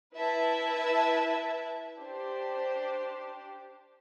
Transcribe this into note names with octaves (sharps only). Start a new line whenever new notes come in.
E4 B4 E5 A5
D4 G4 C5